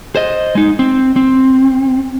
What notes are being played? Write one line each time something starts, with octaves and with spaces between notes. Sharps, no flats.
C5 D#5
G#3 D#4
C4
C4